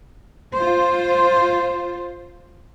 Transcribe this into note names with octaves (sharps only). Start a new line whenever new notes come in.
F4 C5